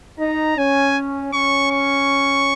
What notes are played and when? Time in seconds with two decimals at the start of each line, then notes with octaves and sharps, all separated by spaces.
0.20 D#4 A#5
0.58 C#4 G#5
1.33 C#4 C#6
1.71 C#6